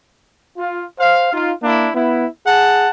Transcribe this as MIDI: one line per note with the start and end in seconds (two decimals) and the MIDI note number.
0.56 0.83 65
0.99 1.29 72
0.99 1.29 77
1.33 1.53 63
1.33 1.53 65
1.63 1.89 58
1.63 1.89 62
1.63 1.89 64
1.95 2.26 59
1.95 2.26 64
2.46 2.91 68
2.46 2.91 78
2.46 2.91 81